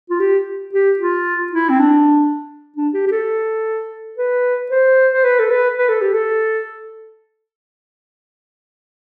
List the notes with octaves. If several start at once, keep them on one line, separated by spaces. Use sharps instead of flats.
F4
G4
G4
F4
E4
C4
D4
D4
G4
G4
A4
B4
C5
C5
B4
A4
B4
B4
A4
G4
A4